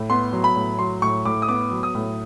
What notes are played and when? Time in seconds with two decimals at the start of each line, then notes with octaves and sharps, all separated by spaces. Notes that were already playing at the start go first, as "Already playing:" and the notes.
Already playing: A2
0.10 B3 C6
0.33 F#3
0.44 B5
0.56 A2
0.79 F#3 C6
1.02 A2 C#6
1.25 A2 D6
1.42 D#6
1.48 B3 D6
1.71 F#3
1.83 D#6
1.95 A2